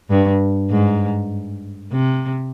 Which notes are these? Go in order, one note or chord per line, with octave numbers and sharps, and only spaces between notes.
G2
G#2
C3